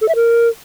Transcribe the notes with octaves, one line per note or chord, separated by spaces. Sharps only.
A4
E5
A#4